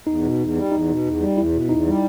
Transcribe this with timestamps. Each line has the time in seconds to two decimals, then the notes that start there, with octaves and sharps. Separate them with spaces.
0.07 E2 D#4
0.23 B2
0.39 E2
0.55 G3
0.71 E2 D#4
0.89 B2
1.04 E2
1.21 G3
1.37 E2 E4
1.53 B2
1.69 E2 D#4
1.86 G3